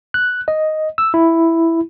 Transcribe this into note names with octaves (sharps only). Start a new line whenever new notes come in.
F#6
D#5
E6
E4